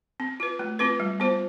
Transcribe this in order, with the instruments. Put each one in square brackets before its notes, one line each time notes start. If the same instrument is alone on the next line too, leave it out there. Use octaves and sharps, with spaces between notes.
[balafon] C4
F4 B4
A3
C4 F4 B4
G3
B3 F4 C5